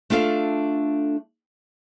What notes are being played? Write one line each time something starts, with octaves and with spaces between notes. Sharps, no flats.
A3 D4 F4 A4 F5